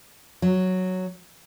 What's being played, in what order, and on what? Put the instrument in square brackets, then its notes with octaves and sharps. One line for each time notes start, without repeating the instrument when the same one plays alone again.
[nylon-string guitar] F#3